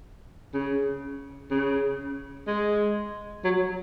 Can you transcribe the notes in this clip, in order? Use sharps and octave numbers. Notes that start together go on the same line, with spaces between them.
C#3
C#3
G#3
F#3